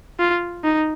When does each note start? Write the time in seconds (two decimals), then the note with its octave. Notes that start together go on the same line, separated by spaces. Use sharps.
0.19 F4
0.64 D#4